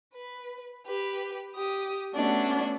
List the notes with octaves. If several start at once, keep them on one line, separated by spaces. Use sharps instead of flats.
B4
G4 B4
G4 D#6
A3 B3 C#4 D4 F#4